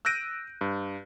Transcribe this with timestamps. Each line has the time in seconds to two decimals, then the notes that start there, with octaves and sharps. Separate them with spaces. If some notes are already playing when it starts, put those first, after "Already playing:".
0.05 E6 F#6 G6 A#6 D7 D#7
0.61 G2